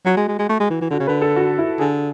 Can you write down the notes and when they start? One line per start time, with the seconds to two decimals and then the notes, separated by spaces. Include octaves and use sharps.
0.06 F#3 F#4
0.17 G#3
0.28 G#3
0.39 G#3
0.49 A3
0.60 G#3
0.70 E3
0.81 E3
0.90 D3 F#4
1.00 C#3
1.07 D3 B4
1.22 A4
1.36 F#4
1.58 E4
1.79 D3 G#4